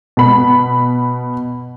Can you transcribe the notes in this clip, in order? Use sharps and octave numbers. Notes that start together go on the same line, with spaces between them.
B2 B5